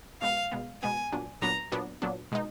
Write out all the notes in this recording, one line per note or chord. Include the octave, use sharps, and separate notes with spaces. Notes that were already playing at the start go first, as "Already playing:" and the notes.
B2 G#3 B3 F5
B2 G#3 B3
B2 G#3 B3 G#5
A#2 F#3 B3 D4
A#2 F#3 B3 D4 A#5
A#2 F#3 B3 D4
A#2 F#3 B3 D4
B2 G#3 D#4